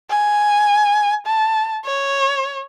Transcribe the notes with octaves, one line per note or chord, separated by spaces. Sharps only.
G#5
A5
C#5